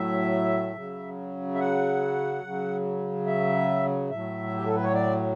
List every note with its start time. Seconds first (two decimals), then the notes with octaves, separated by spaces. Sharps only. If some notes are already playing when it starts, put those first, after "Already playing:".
Already playing: A2 F#3 E5
0.75 C#3 F#3
1.55 E5
1.59 F#5
2.43 C#3 F#3
3.27 E5
4.10 A2 F#3 E5
4.55 G4
4.66 A4
4.75 B4
4.83 C#5
4.94 D5